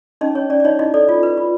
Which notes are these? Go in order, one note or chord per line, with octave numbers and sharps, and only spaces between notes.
C#4 D#4 D#5
C#4 C#5
C#4 D5
D5
D#4 C#5 D#5
D#4 E4 D#5
A4 D5
F4 D5
B4
F4